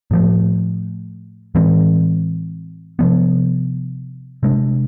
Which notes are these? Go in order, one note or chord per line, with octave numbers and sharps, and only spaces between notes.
A2 F3 A3
A2 E3 G#3 C4
C3 F3 B3
C3 G#3 D4